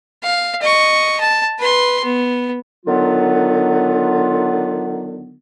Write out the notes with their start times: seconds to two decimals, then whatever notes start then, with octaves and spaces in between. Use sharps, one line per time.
0.23 F5
0.62 D#5 C#6
1.20 A5
1.59 B4 C6
2.04 B3
2.86 D3 D#3 F#3 B3 F4